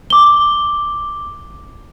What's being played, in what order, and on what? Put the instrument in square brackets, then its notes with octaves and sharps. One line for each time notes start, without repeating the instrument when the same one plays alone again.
[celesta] D6 G7